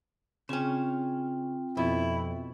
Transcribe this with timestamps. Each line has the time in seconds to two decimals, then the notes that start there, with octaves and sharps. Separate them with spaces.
0.49 C#3 C4 C#4 F4 G5
1.77 F2 B2 E4